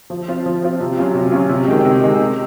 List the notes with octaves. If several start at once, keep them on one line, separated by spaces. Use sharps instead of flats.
F3
C4 F4
F3
C4 F4
C3
F#3 C#4 F4
C3
F#3 C#4 F4
C3
D#3 G#3
C3
D#3 G#3
C3